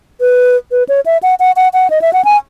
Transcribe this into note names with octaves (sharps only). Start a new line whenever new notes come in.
B4
B4
C#5
E5
F#5
F#5
F#5
F#5
D#5
E5
F#5
G#5